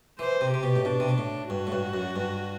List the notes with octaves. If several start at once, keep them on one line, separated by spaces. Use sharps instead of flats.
E3 C5
C3
C3 G4
B2
A2
B2 D4
C3
B2
A2
G2 F#4
A2
G2
F#2
G2